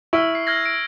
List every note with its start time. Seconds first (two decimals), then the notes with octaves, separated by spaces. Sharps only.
0.13 E4 C#6 E6 F6
0.35 C7
0.47 F6 G#6 A#6
0.65 G#6 D7